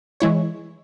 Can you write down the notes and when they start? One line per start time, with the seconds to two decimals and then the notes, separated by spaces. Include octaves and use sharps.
0.20 E3 G#3 E4 C#5